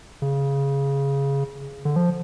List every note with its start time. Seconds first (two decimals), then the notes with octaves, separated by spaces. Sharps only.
0.22 C#3
1.85 D3
1.96 F3